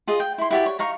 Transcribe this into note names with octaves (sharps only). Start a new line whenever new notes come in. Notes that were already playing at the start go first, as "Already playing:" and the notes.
F4 G#4 D#5
G5
E4 C6
E4 F#4 G4 D5
C#5
D#4 F5 A#5 C#6